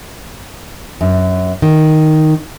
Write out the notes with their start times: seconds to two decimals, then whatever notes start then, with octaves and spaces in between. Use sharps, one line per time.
1.01 F#2
1.62 D#3